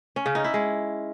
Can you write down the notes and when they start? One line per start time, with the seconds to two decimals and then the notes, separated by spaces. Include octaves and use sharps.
0.16 C#4
0.26 C#3
0.35 D#4
0.44 E4
0.54 G#3